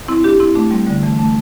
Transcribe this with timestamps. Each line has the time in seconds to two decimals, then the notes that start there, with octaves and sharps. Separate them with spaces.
0.08 C4 E4
0.24 D4 G4
0.40 C4 E4
0.55 A3 D4
0.71 G3 C4
0.87 D3 G3
1.03 E3 A3
1.19 A3 D4